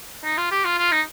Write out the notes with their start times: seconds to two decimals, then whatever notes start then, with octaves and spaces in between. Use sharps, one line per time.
0.24 D#4
0.37 F4
0.51 G4
0.65 F4
0.78 F4
0.92 D#4